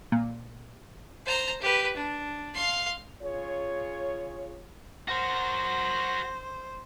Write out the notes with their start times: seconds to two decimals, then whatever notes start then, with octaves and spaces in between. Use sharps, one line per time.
0.12 A#2
1.26 C5 A#5
1.62 G4 B4
1.97 D4
2.54 F5 C6
3.22 C#3 F4 G#4 C#5
5.08 F#4 A#4 C5